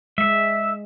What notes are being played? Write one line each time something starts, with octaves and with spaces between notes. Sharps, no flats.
G#3 E5